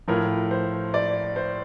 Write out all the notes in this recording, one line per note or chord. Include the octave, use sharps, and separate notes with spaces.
A2 F3 A#4
C5
D5
C5